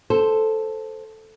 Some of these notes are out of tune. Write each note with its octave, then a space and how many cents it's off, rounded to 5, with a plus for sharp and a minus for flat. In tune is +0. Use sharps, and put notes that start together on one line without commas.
A4 +0 C5 +0